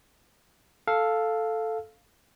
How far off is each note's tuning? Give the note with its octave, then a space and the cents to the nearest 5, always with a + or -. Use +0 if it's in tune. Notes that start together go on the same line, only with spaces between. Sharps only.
A4 +0 F5 +0